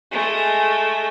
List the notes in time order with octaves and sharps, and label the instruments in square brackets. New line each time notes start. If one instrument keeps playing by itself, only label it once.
[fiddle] G#3 A3